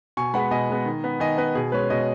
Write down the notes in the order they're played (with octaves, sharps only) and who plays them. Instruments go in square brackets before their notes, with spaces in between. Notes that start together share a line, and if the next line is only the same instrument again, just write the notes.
[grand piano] B2 G#5 C#6
G#3 B3 F#5 B5
B2 D#5 G#5
G#3 B3
D#3
B3
D#3 D#5 G#5
B3 B4 D#5
B2 G#4
G#3 C#4 B4
B2 B4 D#5